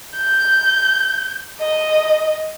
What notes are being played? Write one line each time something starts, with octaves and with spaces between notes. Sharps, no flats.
G6
D#5